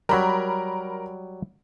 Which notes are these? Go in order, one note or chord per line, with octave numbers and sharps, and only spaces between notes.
F#3 G3 A#4 B5